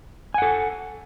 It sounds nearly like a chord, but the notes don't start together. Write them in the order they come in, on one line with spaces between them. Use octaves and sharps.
G#5 F#5 A4